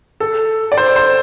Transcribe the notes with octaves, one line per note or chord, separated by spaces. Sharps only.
A4
D5
C5
C5